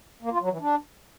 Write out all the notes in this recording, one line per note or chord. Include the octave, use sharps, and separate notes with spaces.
A#3
F4
F#3
E3
D4